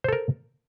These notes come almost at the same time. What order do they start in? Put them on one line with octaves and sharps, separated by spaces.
C5 A4 A#4